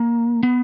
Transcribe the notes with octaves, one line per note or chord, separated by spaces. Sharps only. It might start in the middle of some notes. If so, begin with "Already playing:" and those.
Already playing: A#3
B3